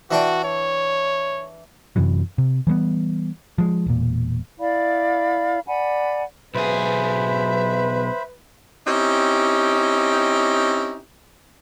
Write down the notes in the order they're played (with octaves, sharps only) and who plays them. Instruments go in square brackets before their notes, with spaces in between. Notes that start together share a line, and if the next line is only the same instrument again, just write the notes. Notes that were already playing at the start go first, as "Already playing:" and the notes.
[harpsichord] E3 D4 G5 [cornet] F#4
[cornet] C#5
[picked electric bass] F#2 C3 E3 F#3
C3
E3 G3 A3 B3
F3 G#3
E1 A#2
[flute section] E4 D5 F5 B5
D5 F#5 G#5 B5
[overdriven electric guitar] B1 G#4 [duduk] B4 [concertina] C5 B5 [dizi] E5
[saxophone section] C4 C#4 D#4 E4 G4